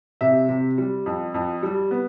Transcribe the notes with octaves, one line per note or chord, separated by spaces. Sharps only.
C3 E5
C3
G3
F2
F2
G3
B3